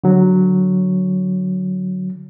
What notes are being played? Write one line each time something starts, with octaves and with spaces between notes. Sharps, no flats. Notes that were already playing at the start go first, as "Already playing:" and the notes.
D3 F#3